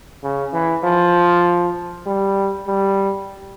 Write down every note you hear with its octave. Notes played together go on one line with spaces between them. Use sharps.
C#3
E3
F3
G3
G3